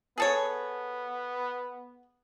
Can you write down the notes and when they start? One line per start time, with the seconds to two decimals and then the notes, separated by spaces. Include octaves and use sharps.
0.18 B3 G#4 A4 C#5